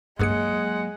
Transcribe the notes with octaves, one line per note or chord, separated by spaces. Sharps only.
G2 F#3 G#3 A#3 G#4 F#5 C#7